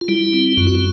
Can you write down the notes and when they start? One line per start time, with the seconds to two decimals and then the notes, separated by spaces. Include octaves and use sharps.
0.01 F4
0.08 G3 E4
0.33 C4
0.57 F#2 F4
0.67 F#4
0.75 F4